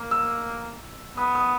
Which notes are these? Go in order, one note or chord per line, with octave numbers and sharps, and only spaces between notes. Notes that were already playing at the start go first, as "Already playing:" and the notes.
Already playing: A#3
E6
B3 D#6
D#6